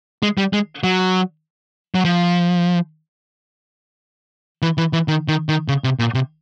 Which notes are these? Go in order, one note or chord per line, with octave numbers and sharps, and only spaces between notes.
G#3
G3
G#3
F#3
F#3
F3
E3
E3
E3
D#3
D#3
D#3
C#3
C3
A#2
C3